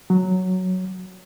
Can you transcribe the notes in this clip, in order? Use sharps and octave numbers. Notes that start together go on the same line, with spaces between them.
F#3